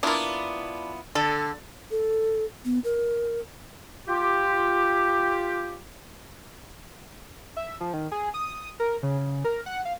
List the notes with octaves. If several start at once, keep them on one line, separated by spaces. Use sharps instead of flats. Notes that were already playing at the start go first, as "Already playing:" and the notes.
A#3 B3 D4 E4 F4
D3 A4
A4
B3
A#4
F4 G4
E5
F3
D#3
G#4
D#6
A#4
C#3
C#3
A#4
F#5
F5